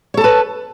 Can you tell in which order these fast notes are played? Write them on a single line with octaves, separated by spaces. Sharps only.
C#5 A4 A5 B4